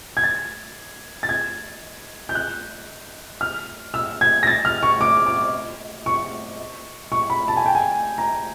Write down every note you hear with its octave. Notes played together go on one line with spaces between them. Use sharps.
G#6
A6
A6
G#6
G6
F#6
F6
E6
G#6
A#6
A6
F6
C#6
D6
D6
C#6
C#6
B5
A5
G#5
G5
G#5
A#5